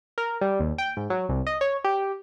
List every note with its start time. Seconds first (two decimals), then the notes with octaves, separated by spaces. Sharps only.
0.18 A#4
0.41 G3
0.60 D#2
0.78 G5
0.97 G#2
1.10 F#3
1.29 C2
1.47 D#5
1.61 C#5
1.84 G4